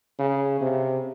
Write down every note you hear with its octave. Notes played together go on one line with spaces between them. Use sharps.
C#3
C3